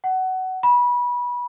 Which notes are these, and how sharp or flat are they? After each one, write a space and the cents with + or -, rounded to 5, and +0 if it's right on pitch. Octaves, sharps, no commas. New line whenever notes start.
F#5 +20
B5 -25